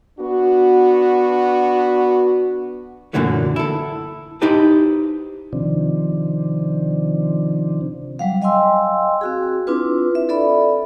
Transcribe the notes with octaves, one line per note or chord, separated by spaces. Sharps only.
B3 D4 F#4
F#2 A#2 D3 E3 F#3 A3
E4 A4
D#4 E4 G4 B4 C5 A5
C3 D#3 F3 C4 D4
F#3 G3 F5
D#5 F5 G5 G#5 C6 E6
C4 F#4 G#4
C4 D4 E4 F4 B4
E5
A4 D5 E5 B5